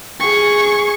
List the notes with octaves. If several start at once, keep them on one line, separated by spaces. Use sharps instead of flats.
G#4 C#6